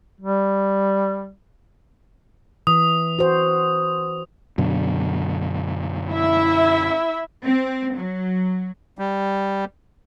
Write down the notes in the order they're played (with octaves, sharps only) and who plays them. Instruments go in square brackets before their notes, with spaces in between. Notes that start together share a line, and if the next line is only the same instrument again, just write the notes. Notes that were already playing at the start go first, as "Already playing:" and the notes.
[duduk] G3
[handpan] E3 [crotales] D#6
[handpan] F#4 C5
[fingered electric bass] F#2 B2 D3
[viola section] E4 E5
[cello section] C4
F#3
[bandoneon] G3